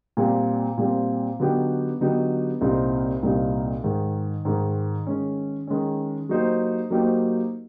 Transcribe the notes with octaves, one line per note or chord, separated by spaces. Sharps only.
A#2 G3 C4
A#2 G3 C4
D3 F#3 B3 D#4 G4
D3 F#3 B3 D#4 G4
C2 A#2 G3 C4 D#4
C2 A#2 G3 C4 D#4
G#2 D#3 G#3
G#2 D#3 G#3
D#3 G#3 C#4
D#3 G#3 C#4
F#3 A#3 D#4 G4 C5
F#3 A#3 D#4 G4 C5